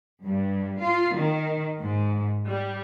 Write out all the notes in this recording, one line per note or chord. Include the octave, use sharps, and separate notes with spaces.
G2
F4
D#3
G#2
G3